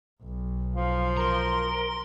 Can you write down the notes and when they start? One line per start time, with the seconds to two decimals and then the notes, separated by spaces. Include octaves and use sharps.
0.23 B1
0.75 F3 F5
1.17 A#4 A#5 C6